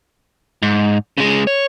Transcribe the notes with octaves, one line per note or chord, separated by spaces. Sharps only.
G#2
C#3 G#3
C#5